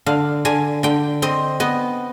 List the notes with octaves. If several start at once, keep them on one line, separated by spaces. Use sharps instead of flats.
D3 F5
D3 G#5
D3 G5
C4 D#5
B3 D#5